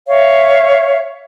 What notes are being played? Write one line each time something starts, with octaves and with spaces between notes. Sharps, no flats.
C#5 E5 F5